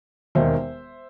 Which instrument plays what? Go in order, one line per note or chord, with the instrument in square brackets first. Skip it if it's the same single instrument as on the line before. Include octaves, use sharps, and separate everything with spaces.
[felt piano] E1 D#2 D#3 C5 E5